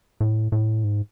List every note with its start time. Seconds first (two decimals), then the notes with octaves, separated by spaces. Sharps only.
0.21 A2
0.52 A2
0.84 G#2